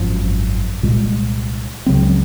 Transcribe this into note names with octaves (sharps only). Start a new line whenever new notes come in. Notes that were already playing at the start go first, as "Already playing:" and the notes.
Already playing: G#1 F#2 F3
C2 A#2 G#3
C#2 C#3 F#3 C4